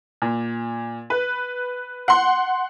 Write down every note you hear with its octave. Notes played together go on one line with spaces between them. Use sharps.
A#2
B4
F#5 C6